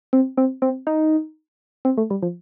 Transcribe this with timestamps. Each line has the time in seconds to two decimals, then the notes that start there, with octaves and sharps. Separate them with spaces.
0.13 C4
0.37 C4
0.62 C4
0.87 D#4
1.85 C4
1.97 A3
2.10 G3
2.22 F3